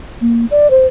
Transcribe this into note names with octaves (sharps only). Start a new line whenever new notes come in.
A#3
D5
C5